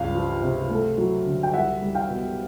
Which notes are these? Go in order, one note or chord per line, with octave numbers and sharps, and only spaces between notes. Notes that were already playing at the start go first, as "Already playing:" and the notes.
Already playing: C#2 G2 F5
F3
C3
A3
F#3
D3
G5
C2 E5 F#5
G3
F5 G5
B2